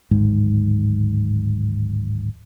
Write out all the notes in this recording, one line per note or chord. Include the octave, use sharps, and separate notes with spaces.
D1 G#1 G#2